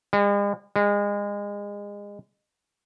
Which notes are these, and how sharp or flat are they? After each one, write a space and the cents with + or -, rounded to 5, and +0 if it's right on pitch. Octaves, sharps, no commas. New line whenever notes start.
G#3 -45
G#3 -30